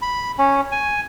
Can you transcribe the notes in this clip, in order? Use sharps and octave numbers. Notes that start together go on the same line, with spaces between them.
B5
C#4
G#5